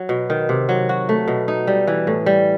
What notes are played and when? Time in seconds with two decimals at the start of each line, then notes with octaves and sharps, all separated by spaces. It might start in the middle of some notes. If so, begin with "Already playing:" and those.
Already playing: F#3
0.09 B2
0.30 D#3
0.49 C3
0.69 F#3
0.89 F#4
1.09 A3
1.28 B2
1.48 D#4
1.67 G3
1.87 E3
2.07 A2
2.26 G3